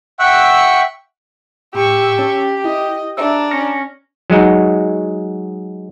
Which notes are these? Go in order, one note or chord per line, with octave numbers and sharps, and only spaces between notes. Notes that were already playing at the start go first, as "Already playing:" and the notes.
E5 F#5 G5 C#6 E6 F#6
A2 G4 C#6 E6
C#4 A5
E4 D#5
D4 E5 A#5 E6
C#4 F6 A#6 C#7
F#3 G#3 D#4 F#4